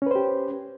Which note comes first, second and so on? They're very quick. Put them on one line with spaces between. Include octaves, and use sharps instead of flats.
C#4 B4 C5 G4